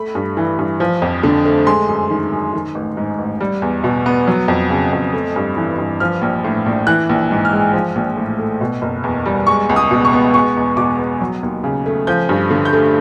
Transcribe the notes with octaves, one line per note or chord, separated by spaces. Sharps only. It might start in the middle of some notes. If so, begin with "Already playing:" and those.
Already playing: A3 B5
G2
E3
G2
F3
F2
D3
A3
G#3 C6
F#2
D#3
F#2
D#3
A1
G#2
A1
G3
E2
B2
B3
F#3
F2
C#3
F2
A3
G2
E3
G2
F3 F6
A#1
A2
A#1
E3 F#6
A#1
G#2
F6
G#3
F3
A#1
A2
A3
B2
F#1
E2
G3
G#3 C#6
C#2
D#6
B2
C#6
B3
G#3 C#6
E2
B2 D6
B3
F#3
D#2
C#3
A3
F3 G6
G2
D3
G6
A3